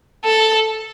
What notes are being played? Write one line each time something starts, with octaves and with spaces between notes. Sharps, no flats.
A4